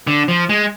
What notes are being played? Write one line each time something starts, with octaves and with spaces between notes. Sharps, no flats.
D3
F3
G#3